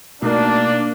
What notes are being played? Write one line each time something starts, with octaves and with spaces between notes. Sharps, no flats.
B2 A3 A#3 D4 D#4